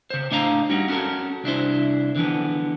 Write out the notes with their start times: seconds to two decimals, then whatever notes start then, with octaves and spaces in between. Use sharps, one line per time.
0.10 C#3 C5
0.31 A2 D4 D#5 F5 A#5
0.70 G3 C#4 D#4 F#4
0.89 C#4 F#4 G4 A4 A#4
1.44 C2 D4 E4 C5
2.16 D3 E3 F3 B3